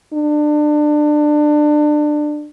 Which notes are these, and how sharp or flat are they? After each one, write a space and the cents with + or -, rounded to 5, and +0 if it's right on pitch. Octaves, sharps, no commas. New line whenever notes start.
D4 +25